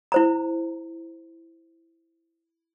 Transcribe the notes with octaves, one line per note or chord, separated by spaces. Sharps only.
E4 C5 A#5